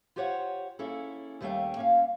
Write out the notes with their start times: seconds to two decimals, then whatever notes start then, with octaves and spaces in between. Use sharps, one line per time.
0.16 F4 G4 C5 C#5 F#5
0.79 A#3 C#4 E4 G#4 A4
1.41 D#2 G3 A3 C#4 F5 G5
1.77 A#3 C#4 F5